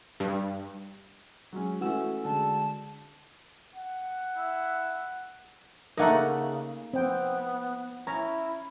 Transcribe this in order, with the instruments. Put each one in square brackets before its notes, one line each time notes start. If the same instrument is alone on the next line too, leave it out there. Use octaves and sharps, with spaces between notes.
[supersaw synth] G2
[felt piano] F#3 G#3 C#4
[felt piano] E3 A3 C#4 [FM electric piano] F#4 E6
[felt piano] D3 G#3 [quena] A5
[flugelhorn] F#5
[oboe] E4
[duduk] C#3 [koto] A3 A#3 D#4 [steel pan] A#4 E5 F#5
[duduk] B3 [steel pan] C4 G5
[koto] C#4 [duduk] E4 [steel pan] A#5